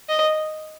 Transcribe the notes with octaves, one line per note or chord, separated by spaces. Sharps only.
D#5